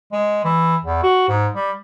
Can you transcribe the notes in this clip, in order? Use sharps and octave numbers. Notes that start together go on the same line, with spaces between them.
G#3
E3
E2
F#4
G#2
G3